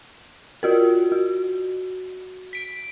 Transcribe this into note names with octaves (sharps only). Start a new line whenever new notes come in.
F4 F#4 A#4
F#4
B6 D7